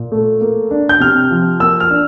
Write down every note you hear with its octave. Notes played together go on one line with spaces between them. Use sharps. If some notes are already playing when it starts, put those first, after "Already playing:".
Already playing: A#2
A3
A#3
D4
G6
C3 F6
F3
A#3 E6
F6
D4